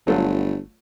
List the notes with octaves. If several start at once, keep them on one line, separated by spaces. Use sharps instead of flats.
G1 F#3 A3 F4